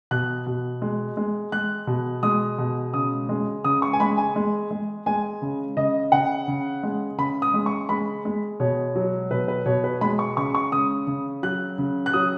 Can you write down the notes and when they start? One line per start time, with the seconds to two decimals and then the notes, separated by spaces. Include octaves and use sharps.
0.11 B2 F#6
0.46 B2
0.82 G#3
1.17 G#3
1.52 G#3 F#6
1.87 B2
2.23 G#3 D#6
2.58 B2
2.94 C#3 D#6
3.29 G#3
3.64 C#3 D#6
3.82 C#6
3.93 G#5
4.00 G#3 B5
4.18 G#5
4.36 G#3
4.71 G#3
5.06 G#3 G#5
5.42 C#3
5.77 C#3 D#5
6.12 C#3 F#5
6.48 C#3
6.83 G#3
7.18 C#3 B5
7.42 D#6
7.54 G#3
7.66 C#6
7.89 G#3 B5
8.25 G#3
8.60 B2 C#5
8.95 F#3
9.31 B2 B4
9.48 B4
9.66 B2 C#5
9.84 B4
10.01 G#3 B5
10.19 C#6
10.37 C#3 C#6
10.55 C#6
10.72 C#3 D#6
11.07 C#3
11.43 F#3 F#6
11.78 C#3
12.06 F#6
12.13 F#3 D#6